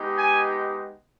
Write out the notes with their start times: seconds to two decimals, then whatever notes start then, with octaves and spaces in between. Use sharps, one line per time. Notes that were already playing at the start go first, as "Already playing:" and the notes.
Already playing: G#3 B3 D#4 G4
0.18 G#5